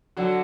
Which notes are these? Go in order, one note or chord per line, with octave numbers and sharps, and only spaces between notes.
D3 F#3 F#4